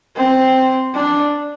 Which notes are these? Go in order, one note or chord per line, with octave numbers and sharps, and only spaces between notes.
C4
D4